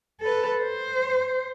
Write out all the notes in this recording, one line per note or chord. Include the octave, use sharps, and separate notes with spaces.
A4 B4
C5